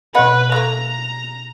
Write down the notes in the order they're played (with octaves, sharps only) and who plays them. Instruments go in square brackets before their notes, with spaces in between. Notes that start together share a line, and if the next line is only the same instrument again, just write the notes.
[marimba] B2 B5 [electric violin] B4 [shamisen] C#5 D#5 F#5
[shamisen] A3 A#3 [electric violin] A#5